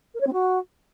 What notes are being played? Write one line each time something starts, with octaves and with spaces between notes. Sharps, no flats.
A#4
C#5
C4
F#4